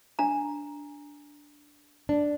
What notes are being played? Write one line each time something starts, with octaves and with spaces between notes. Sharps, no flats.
D4 A#5
D4